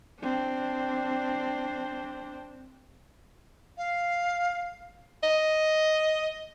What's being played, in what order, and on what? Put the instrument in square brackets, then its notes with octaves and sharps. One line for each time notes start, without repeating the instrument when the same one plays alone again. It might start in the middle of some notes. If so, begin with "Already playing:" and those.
[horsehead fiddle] C4 D4
[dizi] F5
[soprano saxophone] D#5